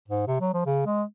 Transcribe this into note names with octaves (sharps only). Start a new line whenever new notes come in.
G#2
C3
F#3
F3
C#3
G#3